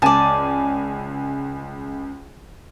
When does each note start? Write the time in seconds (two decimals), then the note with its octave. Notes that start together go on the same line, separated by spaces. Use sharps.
0.02 C#2 D5 G#5 A5